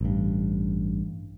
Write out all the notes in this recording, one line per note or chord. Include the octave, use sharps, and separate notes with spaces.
A1 G2